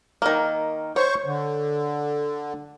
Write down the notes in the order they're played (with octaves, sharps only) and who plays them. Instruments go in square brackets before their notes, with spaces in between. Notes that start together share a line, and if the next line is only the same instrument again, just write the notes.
[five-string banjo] D#3 A#3
[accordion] C5 C#6 [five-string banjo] C#5
[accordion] D3